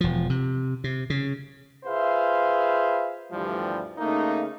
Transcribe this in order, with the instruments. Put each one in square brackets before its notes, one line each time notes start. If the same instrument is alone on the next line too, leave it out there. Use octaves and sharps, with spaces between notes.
[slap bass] E1 F3
C3
C3
C#3
[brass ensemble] F4 G#4 B4 C5 E5 F5
D2 G2 E3 F3 G3
C#3 A3 A#3 D#4